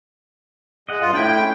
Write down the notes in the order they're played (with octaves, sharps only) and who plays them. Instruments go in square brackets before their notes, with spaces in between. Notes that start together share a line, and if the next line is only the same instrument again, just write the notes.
[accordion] G#3 [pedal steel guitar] D#5 F#5
[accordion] G2 F4
[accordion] A2 G5 [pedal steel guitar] D4 E4
[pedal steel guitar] G#3 C#4 D4